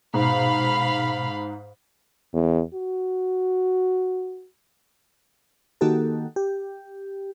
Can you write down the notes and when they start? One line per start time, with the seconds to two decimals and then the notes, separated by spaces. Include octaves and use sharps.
0.14 G#2 B2 F5 B5
2.33 E2
2.74 F#4
5.81 D#3 A#3 D#4 F#4 G4 A4
6.36 G4